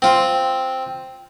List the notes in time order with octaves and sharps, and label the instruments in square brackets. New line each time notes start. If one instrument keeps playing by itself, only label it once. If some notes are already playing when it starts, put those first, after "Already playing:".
[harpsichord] C4 F4